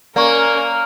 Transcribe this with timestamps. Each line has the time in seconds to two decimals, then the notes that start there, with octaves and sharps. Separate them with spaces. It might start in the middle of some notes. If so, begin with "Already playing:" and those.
0.16 A#3 C#4 A#4 D5 A#5 C#6